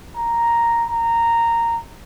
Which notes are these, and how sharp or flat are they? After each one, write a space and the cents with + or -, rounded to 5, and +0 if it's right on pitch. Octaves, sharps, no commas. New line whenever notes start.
A#5 +0
A#5 -10